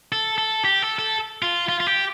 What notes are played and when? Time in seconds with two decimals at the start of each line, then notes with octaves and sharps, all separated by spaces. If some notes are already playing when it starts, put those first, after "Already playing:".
0.12 A4
0.38 A4
0.65 G4
0.82 A4
0.99 A4
1.42 F4
1.69 F4
1.80 F4
1.87 G4